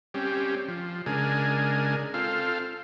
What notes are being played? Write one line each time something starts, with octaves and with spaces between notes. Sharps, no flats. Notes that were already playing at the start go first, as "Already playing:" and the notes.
G3 C4 C#4 G4
F3
C#3 G#3 D4 A#4 G#5
C4 F4 A4 F5